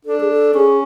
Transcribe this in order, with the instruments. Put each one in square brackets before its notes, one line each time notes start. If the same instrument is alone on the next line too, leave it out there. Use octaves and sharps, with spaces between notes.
[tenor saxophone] D4 [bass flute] A4
[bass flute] G#4
A4
[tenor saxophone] C#4 [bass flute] G#4